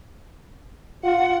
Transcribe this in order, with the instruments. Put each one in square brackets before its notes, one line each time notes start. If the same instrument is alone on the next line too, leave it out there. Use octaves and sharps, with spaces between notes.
[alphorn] F4 [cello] F#5